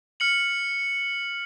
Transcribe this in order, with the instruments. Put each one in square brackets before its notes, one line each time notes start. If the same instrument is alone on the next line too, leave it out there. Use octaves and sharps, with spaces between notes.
[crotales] F6 C#7 F#7